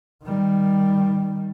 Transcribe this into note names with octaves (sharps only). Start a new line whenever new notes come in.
D#3 G3